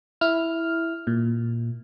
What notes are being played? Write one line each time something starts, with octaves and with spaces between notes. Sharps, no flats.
E4 F6
A#2